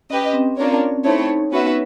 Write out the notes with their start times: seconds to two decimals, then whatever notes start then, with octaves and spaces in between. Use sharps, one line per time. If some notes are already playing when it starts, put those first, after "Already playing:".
0.10 C#4 G4 B4 D#5
0.33 C4
0.57 A#3 C4 D4 F4 A#4 C#5
0.81 C#4
1.04 A3 C4 D#4 E4 A4 C#5
1.52 B3 C#4 F#4 B4 E5